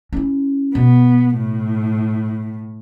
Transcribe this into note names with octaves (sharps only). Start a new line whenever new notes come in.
C#4 E4
B2 B3
A2